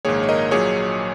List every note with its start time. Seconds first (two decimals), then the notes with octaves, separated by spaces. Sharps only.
0.05 A#1 G#2 D#3 A#3 G#4 C#5
0.23 C#5
0.29 A#4 D#5
0.51 A#1 A#2 F#3 G#4 C#5